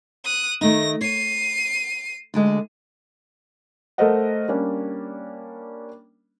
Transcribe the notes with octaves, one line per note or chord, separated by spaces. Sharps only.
D#6 F#6
D#3 A3 D#4 A#6
C#5 C7 D#7
D2 D3 G#3
A3 A4 A#4 C5 D#5 F#5
G3 A#3 C#4 D4